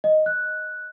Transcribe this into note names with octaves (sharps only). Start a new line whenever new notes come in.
D#5
F#6